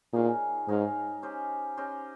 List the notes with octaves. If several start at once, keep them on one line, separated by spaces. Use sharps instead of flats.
A#2 D#4 G#4 C#5 F5
G#2 D#4 G#4 C#5 F5
C#4 G4 C5 D#5
C#4 G4 C5 D#5